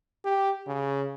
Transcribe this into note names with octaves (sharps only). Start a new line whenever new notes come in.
G4
C#3